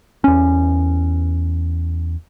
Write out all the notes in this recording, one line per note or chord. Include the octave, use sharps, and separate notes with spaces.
E2 C#4